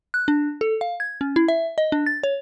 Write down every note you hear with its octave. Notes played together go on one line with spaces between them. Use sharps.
F#6
D4
A4
F5
G#6
C#4
E4
E5
D#5
D4
A6
C#5